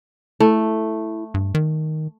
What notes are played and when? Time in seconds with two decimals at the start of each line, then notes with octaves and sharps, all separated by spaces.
0.40 A3 E4
1.34 G2
1.55 D#3